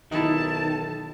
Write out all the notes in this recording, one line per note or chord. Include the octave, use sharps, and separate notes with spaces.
B1 D#3 D#4 E4 A5